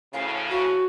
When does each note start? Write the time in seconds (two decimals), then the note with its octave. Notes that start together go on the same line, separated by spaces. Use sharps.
0.13 D2 A2 C#3 F5
0.49 F#4